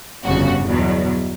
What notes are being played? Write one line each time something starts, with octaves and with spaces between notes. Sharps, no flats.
G1 F2 C#3 F#4
E2 B2 F#3